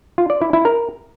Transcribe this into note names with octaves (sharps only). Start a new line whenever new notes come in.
F4
D5
E4
E4
A#4